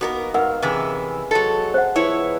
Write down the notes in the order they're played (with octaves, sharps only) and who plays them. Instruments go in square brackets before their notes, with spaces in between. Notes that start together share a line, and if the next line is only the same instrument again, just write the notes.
[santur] A#3 D#4 F#4 [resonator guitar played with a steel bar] B3 A4 A#4
[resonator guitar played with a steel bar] G#2 [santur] B3 F5 [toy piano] A#4 F#5
[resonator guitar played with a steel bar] C3 E3 E4 [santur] C#4 G#4
[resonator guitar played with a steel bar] F#3 A4 [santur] G#3
[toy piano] C5 F#5
[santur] F3 B3 B4 [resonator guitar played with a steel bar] E4 C#5